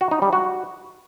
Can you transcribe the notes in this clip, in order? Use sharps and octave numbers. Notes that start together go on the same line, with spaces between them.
F#4
D#4
G3
F#4